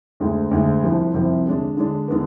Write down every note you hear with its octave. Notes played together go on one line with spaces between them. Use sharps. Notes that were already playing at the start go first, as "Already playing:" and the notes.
D2 D3 G#3
D2 D3 G#3
C2 C3 F3
C2 C3 F3
D3 G#3 D4
D3 G#3 D4
D3 G#3 B3